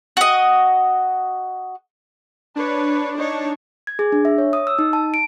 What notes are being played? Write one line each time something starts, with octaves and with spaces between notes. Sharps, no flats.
F#4 D#5
D4 B4 C#5
D#4 C#5 A5
G#6
G#4
D4
E5
C#5
D#6
E6
D#4
A5
D7